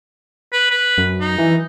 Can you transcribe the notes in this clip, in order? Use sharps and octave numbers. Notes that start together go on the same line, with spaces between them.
B4
B4
F#2
D#4
E3